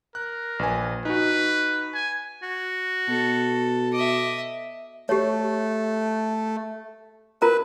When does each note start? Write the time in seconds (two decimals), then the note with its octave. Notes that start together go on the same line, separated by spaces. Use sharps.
0.15 A#4 F#6
0.59 A#1 B4 G#5
1.05 D#4 F#4 B4
1.94 G#5
2.43 F#4
3.08 B2 A4
3.93 D#5 E5 D6
5.09 A3 G4 C#5
7.42 F4 A#4 B4 A#5